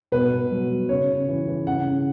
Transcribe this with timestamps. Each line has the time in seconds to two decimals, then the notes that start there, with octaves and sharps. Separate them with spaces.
0.12 B2 B4
0.31 B2
0.51 F#3
0.70 F#3
0.89 C#3 C#5
1.09 C#3
1.28 E3
1.47 E3
1.67 C#3 F#5
1.87 C#3